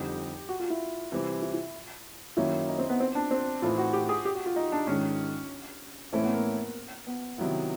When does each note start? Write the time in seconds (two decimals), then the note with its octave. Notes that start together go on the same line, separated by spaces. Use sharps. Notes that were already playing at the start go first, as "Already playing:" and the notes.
Already playing: F2 D3 G3 C4 D#4 G4
0.49 F#4
0.60 F4
0.70 E4
1.12 C3 E3 G3 C4
1.42 E4
1.54 E4
2.37 F#2 D#3 F#3 A#3 C#4 E4
2.68 D#4
2.78 C4
2.89 B3
3.00 C4
3.15 D4
3.31 C4
3.62 A2 E3 A3 C4 D#4 F4
3.78 F#4
3.93 G4
4.09 G#4
4.25 G4
4.35 F#4
4.46 F4
4.56 D#4
4.72 D4
4.87 G#2 D#3 G#3 C#4
6.13 A2 E3 A3 C4 C#4 E4
6.23 B3
6.33 A#3
7.07 B3
7.38 C3 D#3 F#3 B3 E4